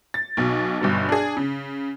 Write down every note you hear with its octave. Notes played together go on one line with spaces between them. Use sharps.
A6
B1 B2
G1 G2 B2
D4 G#4
C#3